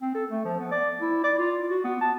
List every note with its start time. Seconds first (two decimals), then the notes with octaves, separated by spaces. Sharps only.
0.02 C4
0.15 A4
0.30 A3
0.45 F3
0.60 B3
0.71 D5
1.00 E4
1.24 D5
1.39 F4
1.71 F#4
1.84 B3
2.01 A5